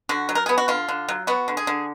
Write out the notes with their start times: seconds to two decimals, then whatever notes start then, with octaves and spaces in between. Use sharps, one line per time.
0.09 D3 F#4
0.29 F#3
0.35 A#4
0.46 B3 G#4
0.58 F#4
0.68 D3 F4
0.89 D3
1.09 F#3
1.27 B3 F#4
1.48 D3
1.57 G#4
1.67 D3